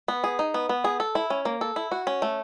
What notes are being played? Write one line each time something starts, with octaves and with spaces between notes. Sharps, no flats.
B3
G#4
D#4
B3
B3
G#4
A4
E4
C#4
A#3
A4
E4
F#4
C#4
A3